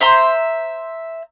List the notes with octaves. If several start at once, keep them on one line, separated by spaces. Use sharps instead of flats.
C5 E5 A#5 C6